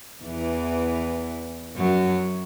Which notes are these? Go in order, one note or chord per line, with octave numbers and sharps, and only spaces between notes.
E2 E3
F#2 F#3